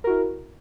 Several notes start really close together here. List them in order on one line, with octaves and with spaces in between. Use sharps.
A#4 F#4 E4